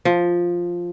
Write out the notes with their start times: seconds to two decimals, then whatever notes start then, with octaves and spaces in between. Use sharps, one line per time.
0.05 F3